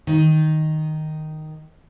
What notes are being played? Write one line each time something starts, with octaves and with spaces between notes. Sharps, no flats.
D#3 D#4